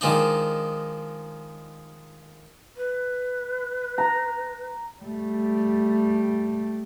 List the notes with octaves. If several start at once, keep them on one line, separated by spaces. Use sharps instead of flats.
D#3 F3 G#3 D4 D#4
B4
A#5
G3 A3